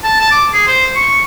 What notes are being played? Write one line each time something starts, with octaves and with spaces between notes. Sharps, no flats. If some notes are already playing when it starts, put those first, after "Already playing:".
A5
A5
D6
G#4
C5
C#6